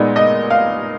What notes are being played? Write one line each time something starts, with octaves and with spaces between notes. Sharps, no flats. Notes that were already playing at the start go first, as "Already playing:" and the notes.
Already playing: A#2 G#3 B3 D#4 D5
D#5
F5